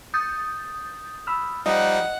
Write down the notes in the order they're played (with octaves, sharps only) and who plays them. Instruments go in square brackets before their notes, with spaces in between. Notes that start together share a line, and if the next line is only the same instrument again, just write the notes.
[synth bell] D#6 G6 A6
[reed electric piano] B5 E6 F6
[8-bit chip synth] F3 G3 D#4 [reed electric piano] D#5 [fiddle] F#5